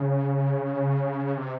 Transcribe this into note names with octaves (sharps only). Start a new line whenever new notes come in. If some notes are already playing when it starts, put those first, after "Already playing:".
Already playing: C#3
C3